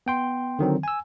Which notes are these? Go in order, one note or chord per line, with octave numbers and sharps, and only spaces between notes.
B3 G5 C6
D3 D#3 F#3 C4
G#5 E6